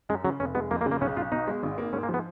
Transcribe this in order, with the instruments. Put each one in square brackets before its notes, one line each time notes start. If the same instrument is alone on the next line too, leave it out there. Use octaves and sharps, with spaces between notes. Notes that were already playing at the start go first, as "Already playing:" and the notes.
[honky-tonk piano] F#2 [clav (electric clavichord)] G#3
[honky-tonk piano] C#3 [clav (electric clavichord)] F#3
[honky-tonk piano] F1 [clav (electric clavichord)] C#4
[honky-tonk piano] G#3 [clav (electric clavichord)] B3
[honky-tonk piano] F2 [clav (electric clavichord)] A#3
[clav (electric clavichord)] A#3
[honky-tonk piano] C#3
[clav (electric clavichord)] A#3
[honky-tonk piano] B1 [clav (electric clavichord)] C#4
[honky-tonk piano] B1 [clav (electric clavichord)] F4
[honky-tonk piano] B2 [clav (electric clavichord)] D#4
[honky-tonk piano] G#3
G#1
A#3
[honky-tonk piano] G#2 [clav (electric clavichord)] C#4
[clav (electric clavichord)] A#3
[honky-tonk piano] F3
[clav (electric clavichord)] B3